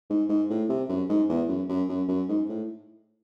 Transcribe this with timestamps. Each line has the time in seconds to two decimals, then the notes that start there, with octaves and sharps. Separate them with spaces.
0.10 G#2
0.29 G#2
0.50 A2
0.70 C3
0.89 F#2
1.09 G#2
1.29 E2
1.49 F#2
1.69 F#2
1.89 F#2
2.09 F#2
2.29 G#2
2.49 A2